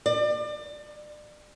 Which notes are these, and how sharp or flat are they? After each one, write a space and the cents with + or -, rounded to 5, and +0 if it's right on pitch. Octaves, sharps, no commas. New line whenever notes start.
D5 +30